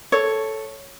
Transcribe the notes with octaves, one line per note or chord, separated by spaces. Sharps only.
A4 C#5